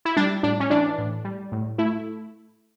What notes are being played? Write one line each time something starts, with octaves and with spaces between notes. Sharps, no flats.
E4
G3 D4
A2 D4
C#4
E3 D4
A2
G3
A2
A3 E4